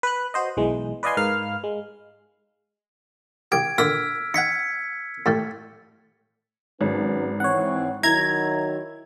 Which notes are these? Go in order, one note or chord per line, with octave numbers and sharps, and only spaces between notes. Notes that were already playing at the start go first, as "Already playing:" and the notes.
B4 F#6
F#4 C5 D#5
B1 E3 G#3
B4 D5 D#5 F5 G#5 C6
G#2 A#4 B4 F5 F6
G#3
C2 G4 G#6 D7
A#2 D3 E6 F6 B6
D#4 F#5 G#6 B6 C#7
A2 G3 A3
G#1 F#3 C#4 B4
E3 C4 C#5 F#5
D#3 F#3 E4 A#5 G#6